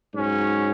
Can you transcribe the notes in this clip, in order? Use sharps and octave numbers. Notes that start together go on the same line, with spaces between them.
G#2 F#3 C#4